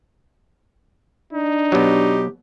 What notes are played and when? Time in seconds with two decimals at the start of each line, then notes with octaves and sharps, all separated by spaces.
1.33 D4 D#4
1.72 B2 F#3 G4